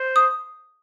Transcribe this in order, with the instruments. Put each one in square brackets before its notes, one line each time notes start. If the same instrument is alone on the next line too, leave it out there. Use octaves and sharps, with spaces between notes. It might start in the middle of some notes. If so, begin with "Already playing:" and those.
Already playing: [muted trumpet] C5
[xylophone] D#6